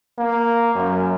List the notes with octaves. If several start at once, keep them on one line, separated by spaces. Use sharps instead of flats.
A#3
F#2